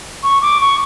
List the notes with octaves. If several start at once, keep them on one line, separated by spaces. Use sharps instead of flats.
C#6
D6
C#6